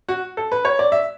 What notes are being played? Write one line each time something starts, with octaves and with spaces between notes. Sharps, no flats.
F#4
A4
B4
C#5
D5
E5